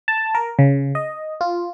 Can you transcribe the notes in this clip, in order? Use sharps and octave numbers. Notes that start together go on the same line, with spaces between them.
A5
A#4
C#3
D#5
F4